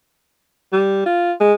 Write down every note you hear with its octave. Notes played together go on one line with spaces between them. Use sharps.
G3
F4
G#3